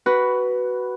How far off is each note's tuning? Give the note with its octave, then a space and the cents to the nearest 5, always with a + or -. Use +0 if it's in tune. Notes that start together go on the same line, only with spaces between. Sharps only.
F#4 +15 B4 +0